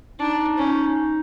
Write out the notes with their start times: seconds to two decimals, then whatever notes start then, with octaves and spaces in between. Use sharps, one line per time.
0.20 D4 D#4
0.58 C#4